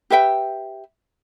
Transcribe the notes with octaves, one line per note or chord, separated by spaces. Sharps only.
G4 B4 E5 G5